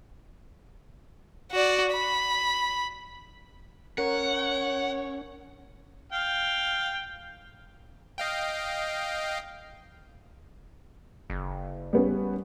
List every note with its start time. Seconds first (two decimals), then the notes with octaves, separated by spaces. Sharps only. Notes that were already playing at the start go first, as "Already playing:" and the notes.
1.52 F#4 D5
1.92 B5
3.98 C#4 A#4 C#5 F#5
6.12 F5 G5
8.18 D#5 F5 G5
11.30 F#1
11.93 G3 B3 C#4